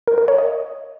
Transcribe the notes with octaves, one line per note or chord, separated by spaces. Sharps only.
A#4
A#4
C#5
D#5